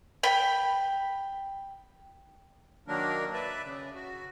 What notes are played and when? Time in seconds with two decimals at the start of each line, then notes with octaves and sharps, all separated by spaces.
0.23 G5 B5
2.88 D#3 F#3 A#3 D4 A#4
3.33 B4 D5 E5
3.64 C#3
3.94 F#4